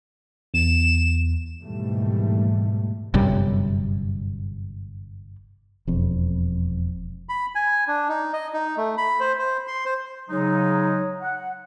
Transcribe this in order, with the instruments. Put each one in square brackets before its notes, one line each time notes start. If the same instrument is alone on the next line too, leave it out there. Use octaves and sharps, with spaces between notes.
[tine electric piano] E2 [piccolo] E7
[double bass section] D#2 G#2 B2 E3 G3 A3
[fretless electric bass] G1 F#2 C3 G3
E1 F2
[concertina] B5
G#5
D4
D#4
D#5
D#4
A3
B5
C5
C5
C6
C5
[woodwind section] C#3 F#3 G#3 D#4
F#5